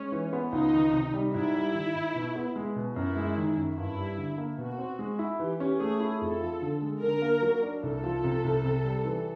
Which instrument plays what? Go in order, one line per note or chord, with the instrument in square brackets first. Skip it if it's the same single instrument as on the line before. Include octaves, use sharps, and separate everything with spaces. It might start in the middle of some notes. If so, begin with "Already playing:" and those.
Already playing: [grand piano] G#3 [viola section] C#4
[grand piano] E3
B3
[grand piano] C#2 [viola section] D#4
[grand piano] D#3
C3
G3
[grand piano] G#2 [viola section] E4
[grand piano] G3
D#3
G#2
B2
B3
G#3
B2
[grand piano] F#2 [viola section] E4
[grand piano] G#3
D#3
F#2
[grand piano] G2 [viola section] E4
[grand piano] G3
D3
A#3
[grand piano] B2 [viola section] F#4
[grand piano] C4
G#3
E4
[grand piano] E3 [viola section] G4
[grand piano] C#4
[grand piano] A3 [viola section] G#4
[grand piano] E4
[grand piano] F2 [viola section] A4
[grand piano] F3
D3
G#3
[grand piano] D3 [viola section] A#4
[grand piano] A#3
F#3
D4
[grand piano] C2 [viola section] A4
[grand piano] F3
C3
C2
C3
G3
E3